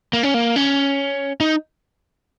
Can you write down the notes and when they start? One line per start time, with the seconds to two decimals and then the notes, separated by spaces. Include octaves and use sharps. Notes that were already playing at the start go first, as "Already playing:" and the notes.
0.13 A#3
0.23 C#4
0.34 A#3
0.56 C#4
1.40 D#4